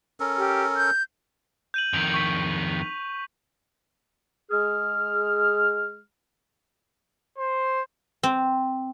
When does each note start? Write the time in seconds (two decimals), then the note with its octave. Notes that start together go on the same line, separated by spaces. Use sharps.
0.20 C#4 A4 A#4
0.37 G4
0.76 G6
1.74 G6 D#7 F#7
1.93 F2 D#3 F7
2.14 C#6 B6
4.51 G#3 G#4 F6
7.38 C5
8.23 C4